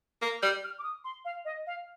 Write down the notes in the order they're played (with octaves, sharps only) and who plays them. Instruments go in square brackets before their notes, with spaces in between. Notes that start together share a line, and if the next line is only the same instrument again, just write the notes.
[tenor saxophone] A#3
[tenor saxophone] G3 [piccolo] G6
[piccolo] F6
D6
D#6
C6
F5
D#5
F5